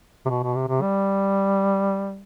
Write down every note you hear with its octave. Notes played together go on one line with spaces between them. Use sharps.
C3
B2
B2
C3
C3
G3